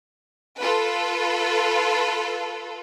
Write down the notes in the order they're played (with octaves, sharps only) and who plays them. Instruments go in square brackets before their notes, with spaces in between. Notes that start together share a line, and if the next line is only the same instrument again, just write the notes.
[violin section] F4 A4 B4